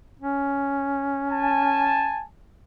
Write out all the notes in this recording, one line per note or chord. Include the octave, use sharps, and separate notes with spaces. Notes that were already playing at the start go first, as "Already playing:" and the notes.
C#4
G#5 A5